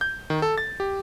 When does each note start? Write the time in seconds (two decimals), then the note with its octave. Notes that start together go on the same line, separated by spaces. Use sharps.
0.01 G6
0.30 D#3
0.42 A4
0.58 A6
0.80 G4